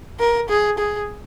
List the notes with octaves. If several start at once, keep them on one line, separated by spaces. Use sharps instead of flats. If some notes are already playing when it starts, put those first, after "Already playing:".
A#4
G#4
G#4